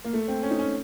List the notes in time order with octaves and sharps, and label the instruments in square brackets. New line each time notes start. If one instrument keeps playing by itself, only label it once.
[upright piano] A#3
A3
C4
C#4
D#4
C#4